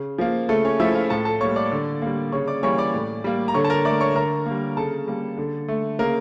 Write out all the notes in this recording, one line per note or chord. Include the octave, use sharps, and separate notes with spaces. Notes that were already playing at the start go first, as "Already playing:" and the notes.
Already playing: C#3
F3 A#3
C#3 A3 A4
C#4 C#5
F3 A3 E4 E5
F4 F5
A2 A4 A5
A4 A5
G3 A#3 C#5 C#6
D5 D6
D3
G3 A#3
C#3 C#5 C#6
D5 D6
E3 G3 A#3 C#5 C#6
D5 D6
A2
G3 A#3
A#5
D3 C#5 C#6
A5
A#4 A#5
A3 D5 D6
C#5 C#6
D3 A#4 A#5
A#3
G3
C#3 A4 A5
G3 A#3
D3
A3
C#3 A#3 A#4